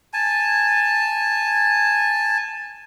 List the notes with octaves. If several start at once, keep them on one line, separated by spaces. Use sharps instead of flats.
G#5 A5